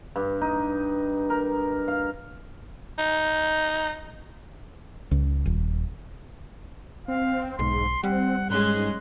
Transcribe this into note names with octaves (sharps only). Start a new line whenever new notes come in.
G2
D#4
A#4
F5
D#4
C#2
D#1
C4 F5
B1 G#2 C6
G3 C4 F#5
G#2 G#3 C#4 C6 F#6